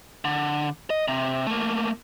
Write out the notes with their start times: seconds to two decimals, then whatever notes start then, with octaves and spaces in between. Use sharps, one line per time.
0.25 D3
0.90 D#5
1.08 C3
1.47 A3 A#3